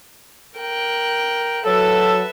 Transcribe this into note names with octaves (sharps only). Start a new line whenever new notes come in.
A#4 G5 F#6
F#3 A4 B4 E5